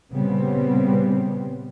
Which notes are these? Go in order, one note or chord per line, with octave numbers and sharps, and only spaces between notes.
A#2 C#3 G3 B3 C4